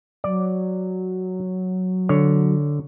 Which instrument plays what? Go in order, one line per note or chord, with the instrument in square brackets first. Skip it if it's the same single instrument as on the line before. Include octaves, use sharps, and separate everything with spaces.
[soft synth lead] F#3 [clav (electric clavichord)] D5
[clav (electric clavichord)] D3 C#5